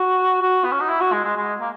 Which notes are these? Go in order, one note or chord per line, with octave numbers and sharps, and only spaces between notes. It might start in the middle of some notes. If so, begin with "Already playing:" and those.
Already playing: F#4
F#4
B3
C#4
D#4
E4
F#4
G#3
G#3
G#3
A#3